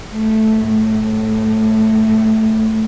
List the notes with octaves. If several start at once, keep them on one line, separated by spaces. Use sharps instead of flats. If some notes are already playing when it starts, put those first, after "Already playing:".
A3
A2